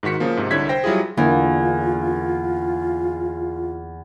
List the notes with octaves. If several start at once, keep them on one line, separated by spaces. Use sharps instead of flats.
G#2 D#3 F#4 B6 C#7
C#3 F3 A#3
G#2 C3
C2 D3 E4 C#5 G#6 B6
C5 G5 A#6
F#3 G3 E4 F4 G#4
E2 D3 A#3 F4